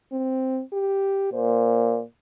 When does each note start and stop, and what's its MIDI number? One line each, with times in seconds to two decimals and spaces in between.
0.12 0.61 60
0.73 1.32 67
1.33 2.01 46
1.33 1.99 72